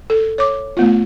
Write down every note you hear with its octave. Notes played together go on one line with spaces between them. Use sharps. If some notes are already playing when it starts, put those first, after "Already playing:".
A4
C#5 D6
A3 B3 F4